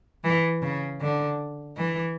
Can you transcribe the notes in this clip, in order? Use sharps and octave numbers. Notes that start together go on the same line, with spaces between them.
E3
C#3
D3
E3